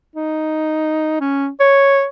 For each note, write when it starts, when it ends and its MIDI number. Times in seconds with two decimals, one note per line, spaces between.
0.16 1.19 63
1.20 1.48 61
1.60 2.06 73